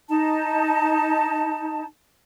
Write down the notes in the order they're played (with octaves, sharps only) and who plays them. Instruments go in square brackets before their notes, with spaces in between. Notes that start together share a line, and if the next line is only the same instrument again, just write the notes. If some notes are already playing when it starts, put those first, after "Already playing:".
[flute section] D#4 A5